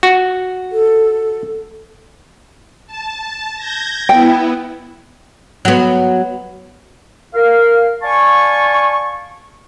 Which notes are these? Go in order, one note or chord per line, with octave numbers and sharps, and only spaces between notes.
F#4
A4
A5
G6 G#6 A#6
B3 E4 G5
F#3 B3
A#4 F5
D5 F5 G#5 A5 C#6